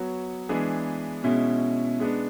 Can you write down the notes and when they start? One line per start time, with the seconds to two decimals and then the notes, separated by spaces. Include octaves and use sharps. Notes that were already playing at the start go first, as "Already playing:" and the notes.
Already playing: F#3 B3 F#4 C#5
0.49 E3 G#3 B3 D4 G#4
1.24 B2 G#3 C#4 E4
2.00 G#3 B3 D4